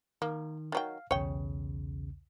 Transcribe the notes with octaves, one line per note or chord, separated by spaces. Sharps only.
D#3 A#3
D#3 F#3 F5 G5
B1 E2 C#3 C#5 G5